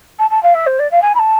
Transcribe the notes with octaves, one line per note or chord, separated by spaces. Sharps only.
A5
A5
F5
E5
C5
D5
F5
G#5
B5
A5